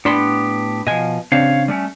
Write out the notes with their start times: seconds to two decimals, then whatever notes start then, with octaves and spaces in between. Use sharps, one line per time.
0.05 A2 B3 D4 G4 B5 C6
0.87 B2 F3 D#5 G#5
1.32 C#3 C4 D4 C#5 F5
1.68 G3 A3 C#4